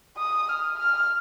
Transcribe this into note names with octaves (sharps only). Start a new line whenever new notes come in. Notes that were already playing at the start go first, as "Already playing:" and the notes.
D#6
F6
F6